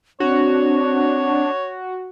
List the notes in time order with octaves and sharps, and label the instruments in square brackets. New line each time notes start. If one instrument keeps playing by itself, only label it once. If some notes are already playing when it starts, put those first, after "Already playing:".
[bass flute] C4 [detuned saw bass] D4 [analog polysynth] F#4 [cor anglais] C#5